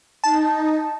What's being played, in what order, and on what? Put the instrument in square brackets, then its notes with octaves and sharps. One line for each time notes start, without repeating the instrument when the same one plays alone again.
[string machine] D#4 [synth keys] A5